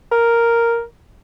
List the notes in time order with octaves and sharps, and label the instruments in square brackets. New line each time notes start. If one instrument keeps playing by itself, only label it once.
[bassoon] A#4